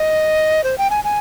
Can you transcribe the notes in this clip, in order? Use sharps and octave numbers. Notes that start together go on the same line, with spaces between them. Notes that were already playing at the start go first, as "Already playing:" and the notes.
Already playing: D#5
C5
G5
G#5
G#5